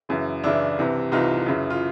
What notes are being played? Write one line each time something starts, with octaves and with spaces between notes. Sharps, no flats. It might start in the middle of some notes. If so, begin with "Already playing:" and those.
F#2 C#3 E3
F#2 C#3 E3 D4 E4
C2 C3 E3
C2 C3 E3 D#4 F4
F#2 C#3 E3
F4